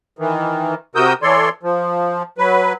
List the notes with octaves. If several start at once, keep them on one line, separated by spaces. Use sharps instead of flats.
D#3 E3
C3 F#4 A#4 D#6 E6 G6
E3 A4 C#5 D5 C6
F3
F#3 B4